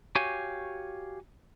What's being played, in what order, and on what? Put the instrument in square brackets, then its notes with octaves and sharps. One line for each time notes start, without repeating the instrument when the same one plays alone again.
[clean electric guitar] F#4 G4 C#5 F5 G#5